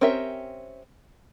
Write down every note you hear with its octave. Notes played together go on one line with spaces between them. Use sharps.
C4 C#4 G4 A#4 E5